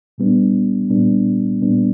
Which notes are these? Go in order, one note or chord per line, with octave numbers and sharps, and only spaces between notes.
A#2 G3 B3 D4
A#2 G3 B3 D4
A#2 G3 B3 D4